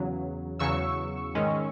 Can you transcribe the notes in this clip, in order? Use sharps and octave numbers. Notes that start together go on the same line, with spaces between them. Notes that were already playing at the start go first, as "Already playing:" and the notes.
Already playing: E2 C#3 F#3
E2 C#3 F#3 C#6 E6
G#2 D#3 G#3 C#4